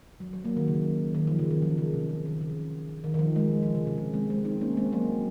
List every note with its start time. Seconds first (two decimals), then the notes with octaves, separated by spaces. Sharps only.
0.20 F#3
0.33 F#3
0.45 F#3 A#3
0.57 D#3
0.68 C#3
1.15 D#3
1.27 F3
1.39 C#3
1.51 D#3
1.62 F3
1.78 C#3
1.93 C3
2.09 C#3
2.25 D#3
2.41 C#3
3.04 D#3
3.14 D#3
3.19 F3
3.36 G#3
3.63 F3
3.75 C#3
3.87 C3
3.98 C#3
4.14 G#3 C4
4.30 G#3 C4
4.45 C4 D#4
4.61 A#3 C#4
4.77 G#3 C4
4.93 F#3 A#3